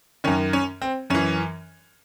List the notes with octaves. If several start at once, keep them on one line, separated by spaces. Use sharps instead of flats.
F#2 D#3 C#4
C#4
C4
F#2 E3 C#4